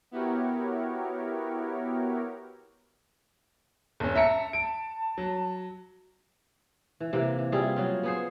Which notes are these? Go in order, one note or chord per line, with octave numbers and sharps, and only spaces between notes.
B3 E4 F#4 G4 A#4 C#5
E1 C#4 A5
E5 A#5 C#7
D7
F#3
E3
C3 E3 A#3
E3
G3 E4 F4 G#4
C#3 F#3 F4
B3 G#4 C5